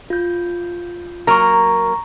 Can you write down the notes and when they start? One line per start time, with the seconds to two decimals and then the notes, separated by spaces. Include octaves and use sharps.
0.10 F4 G6
1.27 F#3 A#3 A#4 A#5 C#6